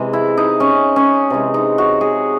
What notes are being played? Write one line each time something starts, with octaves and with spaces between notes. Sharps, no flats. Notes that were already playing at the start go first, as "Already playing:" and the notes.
Already playing: C3 E3 G#3
E4
D#4
C#4
C#4
C3 E3 G#3
D#4
F#4
G#4